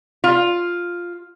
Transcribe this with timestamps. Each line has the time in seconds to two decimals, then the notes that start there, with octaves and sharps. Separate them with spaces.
0.24 F4